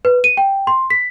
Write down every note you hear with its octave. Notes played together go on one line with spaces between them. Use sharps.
B4
D#7
G5
C6
B6